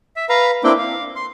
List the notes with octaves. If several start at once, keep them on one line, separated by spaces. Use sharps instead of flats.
E5
B4 F5 A#5
A#3 C4 D4 E4 D5 G5
F5
C6